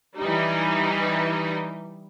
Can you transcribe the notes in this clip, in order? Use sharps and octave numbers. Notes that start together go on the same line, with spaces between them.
E3 G3 D#4